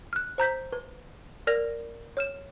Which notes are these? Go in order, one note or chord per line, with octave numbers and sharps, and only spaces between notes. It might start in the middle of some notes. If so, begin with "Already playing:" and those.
F6 F#6
C5 A#5 G6 B6
B4
A#4 D5 F6 A#6 F7
C#5 F6 E7